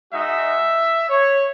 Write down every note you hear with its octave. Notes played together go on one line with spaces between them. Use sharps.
G#3 D#4 F#4 E5
C#5